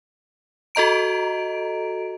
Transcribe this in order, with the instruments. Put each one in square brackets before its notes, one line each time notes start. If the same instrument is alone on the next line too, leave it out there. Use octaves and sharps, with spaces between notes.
[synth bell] F#4 A4 D#5 A#5 D7